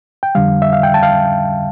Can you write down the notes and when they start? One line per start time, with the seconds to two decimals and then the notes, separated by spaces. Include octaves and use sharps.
0.23 G5
0.35 F2 D3 G3 F5
0.62 E5
0.73 F5
0.83 G5
0.94 A5
1.03 F5